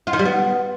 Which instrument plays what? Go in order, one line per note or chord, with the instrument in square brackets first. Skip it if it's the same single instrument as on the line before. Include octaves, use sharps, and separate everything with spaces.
[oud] F4
D#3
G3
B3